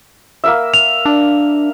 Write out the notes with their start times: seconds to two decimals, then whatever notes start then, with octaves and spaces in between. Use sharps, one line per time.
0.44 A#3 A#4 E5
0.74 F7
1.06 D4